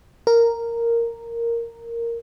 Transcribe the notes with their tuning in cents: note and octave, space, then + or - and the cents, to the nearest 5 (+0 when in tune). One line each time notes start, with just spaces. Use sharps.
A#4 -5